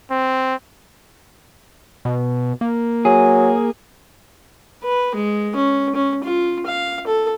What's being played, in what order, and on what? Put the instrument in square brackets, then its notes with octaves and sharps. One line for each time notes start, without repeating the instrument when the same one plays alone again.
[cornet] C4
[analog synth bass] B2
A#3
[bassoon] F#3 [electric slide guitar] G#4
[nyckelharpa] B4
G#3
C#4
C#4
F4
F5
A4